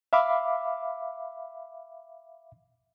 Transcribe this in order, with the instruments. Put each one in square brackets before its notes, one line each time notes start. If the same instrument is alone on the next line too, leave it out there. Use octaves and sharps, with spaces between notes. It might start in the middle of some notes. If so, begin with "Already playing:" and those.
[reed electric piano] E5 F5 B5 D6